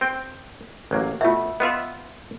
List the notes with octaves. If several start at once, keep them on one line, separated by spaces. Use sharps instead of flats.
C4 G5
A1 F#3 A#3
B2 A3 F4 E5
B3 F4 D#5 E5 C6